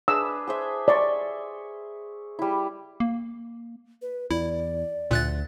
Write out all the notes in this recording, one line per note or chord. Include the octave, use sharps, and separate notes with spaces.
D4 G#4 B4 E6
G#4 C5 E5
D5 E5 C6 C#6
G3 E4
A#3
B4
E2 E4 D5
D2 A#2 F#6 A6